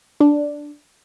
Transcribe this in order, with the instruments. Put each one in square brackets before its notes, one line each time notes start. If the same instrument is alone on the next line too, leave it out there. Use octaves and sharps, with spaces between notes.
[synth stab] D4